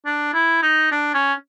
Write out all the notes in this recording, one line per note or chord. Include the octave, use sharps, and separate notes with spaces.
D4
E4
D#4
D4
C#4